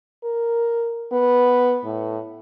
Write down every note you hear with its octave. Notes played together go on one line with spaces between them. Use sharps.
A#4
B3
A2